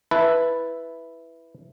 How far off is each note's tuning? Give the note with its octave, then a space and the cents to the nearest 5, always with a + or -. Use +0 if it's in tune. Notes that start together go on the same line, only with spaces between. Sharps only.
E4 +0 B4 +0 A5 +0